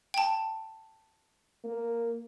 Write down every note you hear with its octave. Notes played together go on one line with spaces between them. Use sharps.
G5 A5
A#3